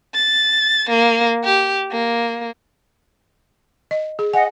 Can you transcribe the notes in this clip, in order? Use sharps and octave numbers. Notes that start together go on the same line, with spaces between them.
A6
A#3
G4
A#3
D#5
G#4
D#5 F#5 G#5